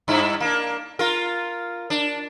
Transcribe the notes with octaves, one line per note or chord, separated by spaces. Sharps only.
G2 E4
A#3 D4
F4 A#4
D4